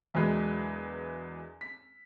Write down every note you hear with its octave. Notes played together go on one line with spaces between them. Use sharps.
E1 E2 E3 F#3 G#3 B4
B6